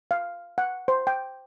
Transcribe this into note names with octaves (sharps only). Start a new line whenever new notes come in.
F5
F#5
C5
G5